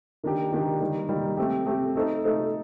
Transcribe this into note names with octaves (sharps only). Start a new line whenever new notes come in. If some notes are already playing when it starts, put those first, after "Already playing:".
D#3 A#3 D4 G4
D#3 A#3 D4 G4
D#3 G3 A#3
D#3 G3 A#3
A3 C4 G4
A3 C4 G4
A3 D#4 A4 C5
A3 D#4 A4 C5